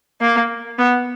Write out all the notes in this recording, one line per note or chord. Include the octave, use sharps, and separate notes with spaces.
A#3
B3